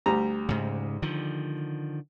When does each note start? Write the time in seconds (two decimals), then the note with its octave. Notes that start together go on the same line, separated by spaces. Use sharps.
0.06 D2 G3 A#5
0.49 G#2 C#3
1.02 D3 D#3 F3